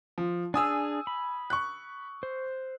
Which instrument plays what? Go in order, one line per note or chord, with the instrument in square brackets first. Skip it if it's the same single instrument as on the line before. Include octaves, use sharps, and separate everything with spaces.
[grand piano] F3
[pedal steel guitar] D4 G#4 [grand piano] G#5 D#6 E6
[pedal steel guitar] B5
[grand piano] C#6 F#6
[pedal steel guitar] C5